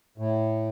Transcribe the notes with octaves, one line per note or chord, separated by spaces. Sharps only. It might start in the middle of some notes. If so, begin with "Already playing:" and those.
A2